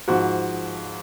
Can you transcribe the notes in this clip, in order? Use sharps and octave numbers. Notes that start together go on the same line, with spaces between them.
G#2 F3 F#4